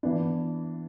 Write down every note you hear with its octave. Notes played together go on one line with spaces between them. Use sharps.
E3 B3 D4